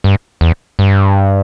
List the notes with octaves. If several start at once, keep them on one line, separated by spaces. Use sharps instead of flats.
G2
E2
G2